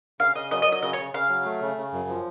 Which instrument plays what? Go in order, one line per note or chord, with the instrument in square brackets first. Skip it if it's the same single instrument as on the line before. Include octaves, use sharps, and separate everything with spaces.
[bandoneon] C#3 [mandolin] F5
[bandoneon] C#3 [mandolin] D#5
[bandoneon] F#3 [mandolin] D#5
[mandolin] D#5
[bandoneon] F#3
[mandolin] D#5
[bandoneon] C#3 [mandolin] D#5
[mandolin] C#5
[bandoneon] C#3
[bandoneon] C#3 [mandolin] F5
[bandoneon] F#3
A3
C#3
C#3
F#2
F3